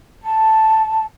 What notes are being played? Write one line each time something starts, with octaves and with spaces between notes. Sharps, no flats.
A5